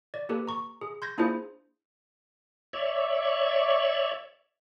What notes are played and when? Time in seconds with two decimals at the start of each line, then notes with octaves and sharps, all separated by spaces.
0.14 D5
0.29 A#3 G4 A4 B4
0.47 A#5 C#6
0.81 G#4
1.02 C6 G6 G#6 A#6
1.18 A#3 D4 E4 F4 G#4 C5
2.73 C#5 D5 E5